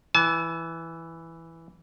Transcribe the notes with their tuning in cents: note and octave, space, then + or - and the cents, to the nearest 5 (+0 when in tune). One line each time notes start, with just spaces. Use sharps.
E3 +0 A5 -45